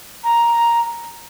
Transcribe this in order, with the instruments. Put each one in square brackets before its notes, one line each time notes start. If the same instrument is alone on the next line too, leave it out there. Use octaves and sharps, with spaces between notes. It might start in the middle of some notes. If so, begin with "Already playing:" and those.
[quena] A#5